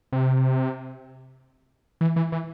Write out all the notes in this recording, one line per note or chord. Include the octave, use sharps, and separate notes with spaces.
C3
E3
E3
E3